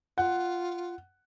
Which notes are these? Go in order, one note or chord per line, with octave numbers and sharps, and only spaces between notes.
F4 F#5